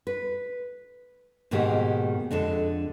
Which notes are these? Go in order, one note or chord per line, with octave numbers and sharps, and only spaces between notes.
B4
G#2 B2 D#3 A#3 G4 G#4
F2 D3 G#3 A4